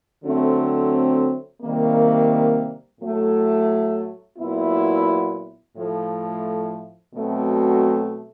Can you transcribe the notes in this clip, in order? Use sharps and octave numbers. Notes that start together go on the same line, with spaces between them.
D3 F#3 A3 C4
C3 D#3 G3 A#3
A2 F#3 A3
A#2 F#3 B3 E4
A2 F3 A3
B2 F#3 A3 C4